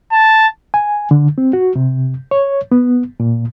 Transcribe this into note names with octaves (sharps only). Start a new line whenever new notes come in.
A5
G#5
D3
C4
F#4
C3
C#5
B3
A#2